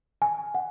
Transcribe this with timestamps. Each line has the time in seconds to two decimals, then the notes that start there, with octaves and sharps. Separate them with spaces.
0.22 G#5
0.55 F#5